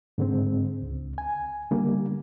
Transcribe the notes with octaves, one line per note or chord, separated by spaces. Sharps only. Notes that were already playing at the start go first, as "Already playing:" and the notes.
G#2 D3 G#3 C4
C#2
G#5
D3 G3 A#3